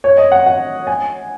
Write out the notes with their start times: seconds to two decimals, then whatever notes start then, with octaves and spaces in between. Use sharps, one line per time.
0.04 C#5
0.17 D#5
0.32 F#5
0.46 F#5
0.87 G#5